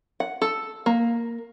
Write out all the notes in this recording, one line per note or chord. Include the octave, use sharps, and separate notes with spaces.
F#5
A4
A#3